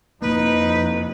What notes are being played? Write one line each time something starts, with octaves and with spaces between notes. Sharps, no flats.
F2 C3 A#3 D#4 B4